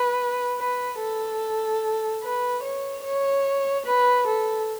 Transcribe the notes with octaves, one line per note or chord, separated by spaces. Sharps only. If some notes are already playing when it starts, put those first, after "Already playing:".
Already playing: B4
B4
A4
B4
C#5
C#5
B4
A4